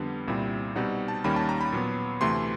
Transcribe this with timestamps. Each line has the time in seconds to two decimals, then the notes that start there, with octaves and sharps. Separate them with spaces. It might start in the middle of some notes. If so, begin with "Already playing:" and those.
Already playing: F2 D3 G3 B3
0.27 C2 A#2 G3 C4 E4
0.75 B2 G3 C4 D#4 F#5
1.08 A5
1.24 D#2 D#3 G3 A#3 C#4 B5
1.36 A5
1.49 A#5
1.61 B5
1.73 A#2 F#3 B3
2.21 D2 C3 E3 A3 C6